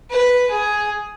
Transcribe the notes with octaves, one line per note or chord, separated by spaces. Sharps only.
B4
G#4